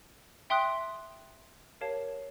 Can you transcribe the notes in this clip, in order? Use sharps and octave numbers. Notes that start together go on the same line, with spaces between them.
E5 G5 C6 D#6 F#6
G4 A#4 C#5 F5 A5